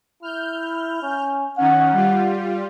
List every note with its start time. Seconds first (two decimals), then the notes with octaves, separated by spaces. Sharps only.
0.22 E4 F6 G6
1.03 C#4
1.58 D#3 C#4 F#5
1.92 G3 F4